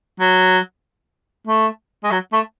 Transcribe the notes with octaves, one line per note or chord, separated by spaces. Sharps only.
F#3
A3
G#3
F#3
A3